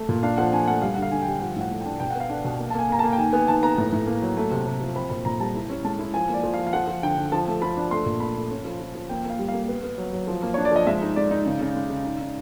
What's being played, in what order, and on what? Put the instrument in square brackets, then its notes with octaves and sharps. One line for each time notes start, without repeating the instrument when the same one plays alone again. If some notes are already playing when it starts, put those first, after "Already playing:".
Already playing: [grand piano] A3
A#2
D4 F5
F3 F#5
D4 G#5
A3 F#5
G3 F5
F#5
D3
F5
D3 G#5
G3 G5
F3 F#5
A2 F#5
A3
D4 G5
B2 G5
B3 F#5
F5
D4 F#5
B2
A#3
A5
A#3 G#5
A#3 A#5
A#3 A5
G5
D#3 G#5
B3 G#5
D#3 A5
B3 A#5
A2
A2
A#3
F#3
A3
C3
C3
F3
C4 B5
A#2 B5
A#2 A#5
G3 A5
E4
C#4
G#3 A5
E4
F3 G#5
A#3
D5
F3
F5
F3
F5
F3 F#5
F3
D3 G5
D3
F3 A5
A3
F3 B5
D4
A3 C6
A#2
A3 B5
A3
C#4
F3
F3
F3
A#3 G5
A#3 F5
G3
F5
A#3
B3
B3
F#3
F#3
F3
A#3
D4 C#5
D5
F3 D#5
G#3 E5
D#4
G#3 D5
D#4
C#3
C#3
G#3
C#3
D#4
D#4